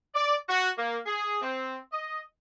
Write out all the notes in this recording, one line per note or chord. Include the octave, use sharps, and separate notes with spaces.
D5
F#4
A#3
G#4
C4
D#5